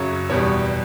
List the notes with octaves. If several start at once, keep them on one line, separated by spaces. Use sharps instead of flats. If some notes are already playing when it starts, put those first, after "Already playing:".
Already playing: F#2 C#3 F#3 C#5
E2 B2 G3 C#5